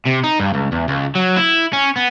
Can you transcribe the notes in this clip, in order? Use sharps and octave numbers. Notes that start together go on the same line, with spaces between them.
C3
D#4
G2
C#2
E2
C#2
F#3
E4
C#4
B3